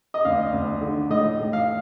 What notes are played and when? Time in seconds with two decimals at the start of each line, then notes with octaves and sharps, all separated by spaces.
0.14 D#5
0.25 D2 F5
0.53 D2
0.81 D3
1.10 A2 D#5
1.39 A2
1.53 F5